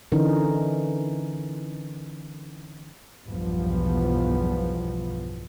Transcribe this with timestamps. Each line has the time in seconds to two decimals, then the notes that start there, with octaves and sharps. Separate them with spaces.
0.12 D3 E3 C#4 D#4 A#4
3.26 B1 E2 G2 F3 B3